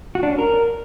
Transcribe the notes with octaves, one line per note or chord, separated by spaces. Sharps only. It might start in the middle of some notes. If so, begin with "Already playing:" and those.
F#4
D4
C#4
A#4